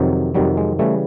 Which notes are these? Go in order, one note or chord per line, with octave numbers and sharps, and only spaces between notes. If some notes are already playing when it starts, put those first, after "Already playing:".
Already playing: F2 C3 D#3 F#3
F2 C3 D#3 F#3 G3
G#3
C#3 E3 G3 A3